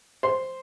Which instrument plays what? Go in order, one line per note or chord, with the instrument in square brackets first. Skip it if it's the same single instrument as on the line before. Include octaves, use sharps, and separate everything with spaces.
[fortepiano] C5